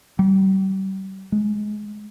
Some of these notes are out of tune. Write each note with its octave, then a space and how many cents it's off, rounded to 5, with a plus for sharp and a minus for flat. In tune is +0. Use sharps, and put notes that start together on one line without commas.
G3 -35
G#3 +20